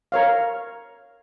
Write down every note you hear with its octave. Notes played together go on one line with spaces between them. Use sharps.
A#4 C#5 F5